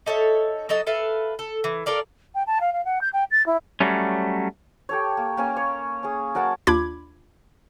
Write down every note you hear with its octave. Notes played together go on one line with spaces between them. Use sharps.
D#4 A4 C#5 E5
F#3 A4 D#5 A5
A4 B4 E5 F5
A4
E3
A4 A#4 D5 F5
G5
A5
F5
F5
F#5
G6
G5
A6
E4
F#3 G3 A3 C#4
G4 A4 C#5
A#3
A#3 C#4 G#5
C#5
C#4 G#4
F#3 A#4 F#5 A5
D#2 D4 F4 B5 D6 G#6